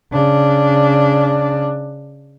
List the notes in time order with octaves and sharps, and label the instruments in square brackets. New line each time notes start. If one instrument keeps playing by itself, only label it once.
[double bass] C#3 D4